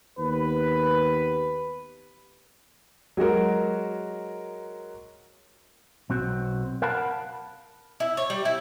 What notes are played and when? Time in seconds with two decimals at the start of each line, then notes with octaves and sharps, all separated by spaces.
0.19 D#2 B3 G4 B4
3.17 F#3 G#3 F#4 A#4
6.10 B1 C4 F#4
6.82 A#4 F5 F#5 A5 B5
8.00 E4
8.17 C#5
8.30 G3
8.45 E4